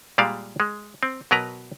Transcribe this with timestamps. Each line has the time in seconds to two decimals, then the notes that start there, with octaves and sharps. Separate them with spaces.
0.18 A#2 G3 G#3 D5 F5
0.60 G#3
1.03 C4
1.31 B2 F#3 A#4 B4 A#5